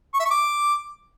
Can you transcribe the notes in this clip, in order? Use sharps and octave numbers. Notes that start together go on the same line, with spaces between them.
C#6
E5
C#6
D6